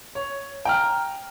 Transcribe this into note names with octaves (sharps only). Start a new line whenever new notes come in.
C#5
G5 A#5 F6